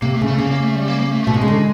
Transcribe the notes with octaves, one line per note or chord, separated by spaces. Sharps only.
C3 A#3
A3
C#3
A3
C#3 A#3
A#3
A3
G3
A#3
A#3
A3
B2 A3
C3 G#3
C#3
D3